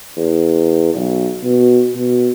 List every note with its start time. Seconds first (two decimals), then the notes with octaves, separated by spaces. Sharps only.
0.17 E2
0.95 B1
1.44 B2
1.95 B2